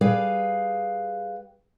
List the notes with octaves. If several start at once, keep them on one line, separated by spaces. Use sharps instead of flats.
G3 G#4 B4 F5